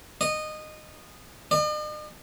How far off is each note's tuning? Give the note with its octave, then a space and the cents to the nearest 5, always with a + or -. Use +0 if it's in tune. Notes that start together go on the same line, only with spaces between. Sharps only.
D#5 -15
D#5 -45